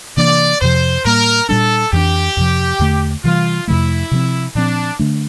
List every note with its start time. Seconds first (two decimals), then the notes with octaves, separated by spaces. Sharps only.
0.17 C3 E3 A#3 D4 D5
0.61 F2 C3 F3 C5
1.05 A2 G3 A#3 A#4
1.49 A#2 G3 D4 A4
1.93 F2 E3 A#3 D4 G4
2.37 F2 C3 F3
2.79 E2 D3 A3
3.23 C3 E3 G3 F4
3.67 F2 C3 F3 A3 E4
4.11 C3 F3 C4
4.55 A#2 F3 C4 D4
4.99 D3 A3 D4